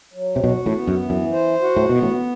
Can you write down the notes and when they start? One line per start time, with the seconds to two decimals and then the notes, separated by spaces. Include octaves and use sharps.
0.14 F#3
0.36 C3
0.43 B1 B2 F#4
0.66 A1 A2
0.73 B3
0.87 F#2
1.03 E3
1.10 F#2
1.32 C5
1.61 F#4
1.76 A2
1.89 B2 B3
2.02 A1 A2